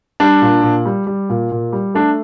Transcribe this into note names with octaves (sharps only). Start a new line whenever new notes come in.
G3 D4
A#2
A#2
G3
G3
A#2
A#2
G3
A3 D4